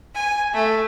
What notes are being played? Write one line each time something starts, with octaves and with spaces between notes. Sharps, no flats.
G#5
A3